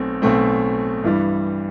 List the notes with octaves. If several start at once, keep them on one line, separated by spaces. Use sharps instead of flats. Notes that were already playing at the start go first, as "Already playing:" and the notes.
Already playing: B1 B2 A3 C4
B1 B2 A3 C4
G2 E3 G3